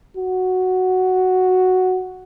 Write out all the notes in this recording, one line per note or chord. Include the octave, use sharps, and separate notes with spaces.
F#4